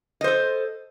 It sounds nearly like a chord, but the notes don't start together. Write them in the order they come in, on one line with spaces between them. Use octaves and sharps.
D#5 C5 A4